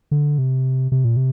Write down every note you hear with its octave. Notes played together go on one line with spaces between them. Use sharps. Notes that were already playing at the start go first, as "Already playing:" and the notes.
D3
C3
C3
A#2
C3